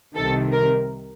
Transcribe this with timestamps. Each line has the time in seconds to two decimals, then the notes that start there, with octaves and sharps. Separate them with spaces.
0.16 C2 C3 D#3 A4
0.53 A#4